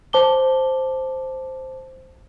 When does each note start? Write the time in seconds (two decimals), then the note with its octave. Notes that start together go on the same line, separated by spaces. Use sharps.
0.13 C5 A5 D6 G7